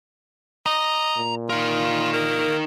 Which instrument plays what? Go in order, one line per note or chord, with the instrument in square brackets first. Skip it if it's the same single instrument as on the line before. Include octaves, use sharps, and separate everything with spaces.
[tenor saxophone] D#5 [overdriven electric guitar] A#5
[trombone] A#2
[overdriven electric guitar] D#4 A#4 [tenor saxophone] F4
[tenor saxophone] A#3